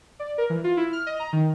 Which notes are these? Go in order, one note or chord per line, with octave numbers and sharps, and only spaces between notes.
D5
A#4
E3
F4
E4
F6
D#5
A#5
D#3